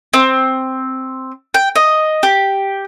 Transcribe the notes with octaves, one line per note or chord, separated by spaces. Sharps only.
C4
G5
D#5
G4